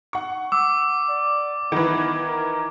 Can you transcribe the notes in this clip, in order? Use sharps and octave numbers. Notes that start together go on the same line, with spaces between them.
F#5 C#6
D6 E6
D5
D#3 E3 B3
A#4